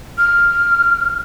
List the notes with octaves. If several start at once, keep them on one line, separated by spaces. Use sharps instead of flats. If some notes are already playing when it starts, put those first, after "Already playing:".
F6